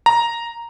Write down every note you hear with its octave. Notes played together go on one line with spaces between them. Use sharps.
A#5